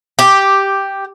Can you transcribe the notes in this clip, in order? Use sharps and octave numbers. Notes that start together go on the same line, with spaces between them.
G4